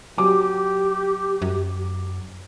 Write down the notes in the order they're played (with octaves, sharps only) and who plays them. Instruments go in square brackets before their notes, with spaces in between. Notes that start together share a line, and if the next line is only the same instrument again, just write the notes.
[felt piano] F#3 D6 [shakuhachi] G4
[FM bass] F#2